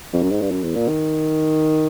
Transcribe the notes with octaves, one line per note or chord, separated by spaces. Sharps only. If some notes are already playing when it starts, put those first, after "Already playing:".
F2
F#2
G#2
G2
F#2
E2
A#2
D#3